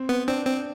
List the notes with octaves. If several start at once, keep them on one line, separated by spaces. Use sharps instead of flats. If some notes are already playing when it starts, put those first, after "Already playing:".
Already playing: C4
B3
C4 D4
C4